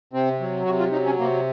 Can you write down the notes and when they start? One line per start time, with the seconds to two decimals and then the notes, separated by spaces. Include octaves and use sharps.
0.13 C3 C4
0.40 F#3
0.65 C3 F#4
0.79 F4
0.92 F#3 D#4
1.06 C#4
1.19 C3 A#3